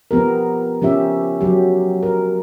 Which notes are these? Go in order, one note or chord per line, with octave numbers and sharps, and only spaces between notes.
F3 B3 G4 A#4
F3 C#4 G4 E5
F#3 G4
A#4